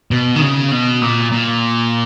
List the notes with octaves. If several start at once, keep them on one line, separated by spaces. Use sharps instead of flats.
B2
D#3
C#3
B2
A#2
A#2